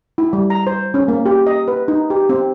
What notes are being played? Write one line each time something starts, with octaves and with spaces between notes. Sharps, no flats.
E4
G3
A#5
C5
C#4
A#3
G4
D#5
B4
D#4
G4
C4